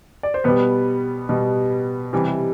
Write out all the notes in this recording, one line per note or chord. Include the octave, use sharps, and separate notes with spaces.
D5
C5
B2 G3 B3 B4
B2 G3
C3 E3 G3